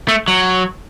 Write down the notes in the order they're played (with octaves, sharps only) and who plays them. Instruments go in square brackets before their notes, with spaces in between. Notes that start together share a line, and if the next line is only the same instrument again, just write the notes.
[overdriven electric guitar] A3
F#3